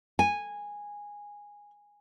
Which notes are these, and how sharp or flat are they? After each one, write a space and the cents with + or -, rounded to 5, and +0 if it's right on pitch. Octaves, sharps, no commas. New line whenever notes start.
G#5 -10